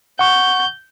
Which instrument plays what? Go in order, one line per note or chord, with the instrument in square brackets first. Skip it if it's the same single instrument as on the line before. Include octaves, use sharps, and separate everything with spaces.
[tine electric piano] F#5 C#6 [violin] G6